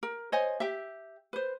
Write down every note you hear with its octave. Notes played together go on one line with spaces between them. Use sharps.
A#4
C5 C#5 D#5 G#5
G4 E5
B4 C5